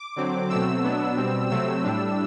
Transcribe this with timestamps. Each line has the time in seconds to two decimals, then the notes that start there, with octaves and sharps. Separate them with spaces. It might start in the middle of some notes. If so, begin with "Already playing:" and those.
Already playing: D6
0.16 D3 F#3 C4
0.50 B2 F#3 A3 C4 E6
0.83 B2 F#3 B3 D4
1.17 B2 G3 C4
1.50 C3 F#3 A3 C4 E6
1.84 A2 G3 D4